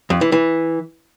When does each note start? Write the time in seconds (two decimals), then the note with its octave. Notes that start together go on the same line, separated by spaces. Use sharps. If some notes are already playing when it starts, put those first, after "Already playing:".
0.10 F2
0.21 E3
0.32 E3